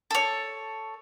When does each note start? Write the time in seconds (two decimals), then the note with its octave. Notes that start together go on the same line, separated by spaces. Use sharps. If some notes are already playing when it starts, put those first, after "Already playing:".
0.11 A4 C#5